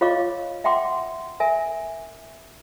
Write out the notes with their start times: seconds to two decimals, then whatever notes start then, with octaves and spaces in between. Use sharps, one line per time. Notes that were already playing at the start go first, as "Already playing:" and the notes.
0.01 F4 C#5 D#5 F5 C#6 D6
0.64 E5 F#5 G5 C6 D6
1.40 A#4 E5 G#5